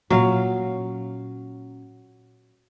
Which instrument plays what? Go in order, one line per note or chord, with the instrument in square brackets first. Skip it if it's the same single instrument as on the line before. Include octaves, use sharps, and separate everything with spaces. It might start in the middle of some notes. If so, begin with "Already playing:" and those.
[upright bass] A#2 C#4 [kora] F#3 F5